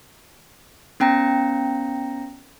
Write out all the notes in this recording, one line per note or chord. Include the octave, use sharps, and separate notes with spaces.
B3 C#4 G5 A#5 A#6